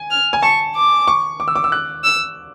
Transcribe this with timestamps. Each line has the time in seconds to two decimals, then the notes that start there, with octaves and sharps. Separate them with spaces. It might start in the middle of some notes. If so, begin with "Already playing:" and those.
Already playing: G#5
0.11 F6
0.33 G#5
0.43 A5 C#6
0.75 D6
1.08 C#6
1.40 D6
1.48 E6
1.56 D6
1.64 E6
1.72 F#6
2.04 E6